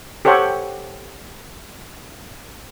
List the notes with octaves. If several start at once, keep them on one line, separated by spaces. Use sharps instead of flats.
G4 A4 C5 C#5 F#5